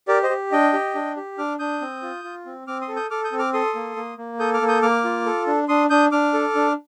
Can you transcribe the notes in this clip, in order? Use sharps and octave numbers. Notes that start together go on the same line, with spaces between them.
G4 A#4 D5
C5 D#5
G4
D4 D#5 G5
G4
D4
G4
D4 D6 F6
D4 D#6 G6
C4
F4
F4
C4
C4 D6 F6
C6 D#6
A4
D#6 G6
A4 D6 F6
D#6 G6
C4
D6 F6
A4 C6 D#6
A#3
A#3
A#3
A4 D#6 G6
D6 F6
A#3
D#6 G6
A#3 D6 F6
F4
A4
D4
D4 C6 D#6
D4 D#6 G6
D4 D6 F6
A4
D4